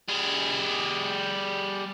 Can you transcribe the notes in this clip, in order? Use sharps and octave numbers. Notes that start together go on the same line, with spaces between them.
G3 G#4